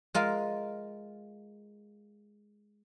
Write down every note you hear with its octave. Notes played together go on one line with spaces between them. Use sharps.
G#3 F4 A#4